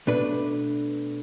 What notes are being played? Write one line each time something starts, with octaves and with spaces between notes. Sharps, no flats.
B2 A3 D4 B4